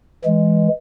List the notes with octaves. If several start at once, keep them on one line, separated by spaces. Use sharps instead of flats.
E3 G#3